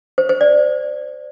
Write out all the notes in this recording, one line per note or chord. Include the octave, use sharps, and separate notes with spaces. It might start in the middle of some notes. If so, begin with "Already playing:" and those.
C5
C5
D5